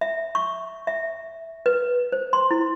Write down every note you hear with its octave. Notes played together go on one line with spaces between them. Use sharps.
E5
C#6
E5
B4
C5
C6
E4